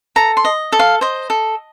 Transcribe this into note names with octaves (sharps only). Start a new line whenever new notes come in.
A4 A#5
C6
D#5
A4
F5
C5 D#5
A4